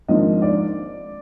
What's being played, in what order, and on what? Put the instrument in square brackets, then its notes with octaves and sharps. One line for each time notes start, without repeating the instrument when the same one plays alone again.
[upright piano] G#1 G#2 F3 A#3 D4 D#5
D5